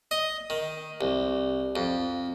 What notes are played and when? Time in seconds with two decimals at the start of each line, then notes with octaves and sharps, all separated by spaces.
0.11 D#5
0.50 D#3
1.01 C2
1.76 F2